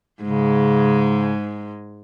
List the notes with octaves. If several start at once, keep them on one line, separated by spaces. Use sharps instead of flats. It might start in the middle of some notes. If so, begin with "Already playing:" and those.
G#2 C#3 G#3